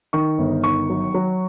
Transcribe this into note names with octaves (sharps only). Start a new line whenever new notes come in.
D#3 C#6
G1
D#3 C#6
F#3
F#3